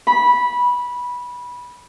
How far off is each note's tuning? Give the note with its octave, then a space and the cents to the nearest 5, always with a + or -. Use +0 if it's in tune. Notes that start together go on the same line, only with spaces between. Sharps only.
B5 -15